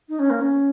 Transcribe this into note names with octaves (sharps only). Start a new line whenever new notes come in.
D#4
C#4
A#3
C#4